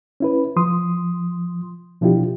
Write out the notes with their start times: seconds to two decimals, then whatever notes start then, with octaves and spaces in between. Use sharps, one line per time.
0.20 C#4 E4 B4
0.56 F3 C6 D#6
2.01 B2 F3 D4 E4 F4 G4